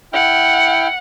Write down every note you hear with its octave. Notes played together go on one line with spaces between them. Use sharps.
E4 F#5 G5 F6